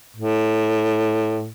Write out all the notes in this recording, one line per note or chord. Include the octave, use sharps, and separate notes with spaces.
A2